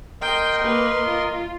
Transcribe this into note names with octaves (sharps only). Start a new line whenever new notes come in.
A#4 D#5 G5 C6
A#3 B4
F4